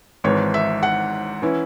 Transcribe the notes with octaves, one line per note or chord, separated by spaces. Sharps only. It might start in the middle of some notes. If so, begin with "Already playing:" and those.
G#1 G#2 E3 C#5
E5
F#5
E3 C#4 E4